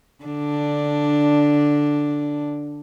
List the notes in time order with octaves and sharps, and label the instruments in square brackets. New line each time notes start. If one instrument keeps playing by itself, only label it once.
[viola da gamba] D3 D4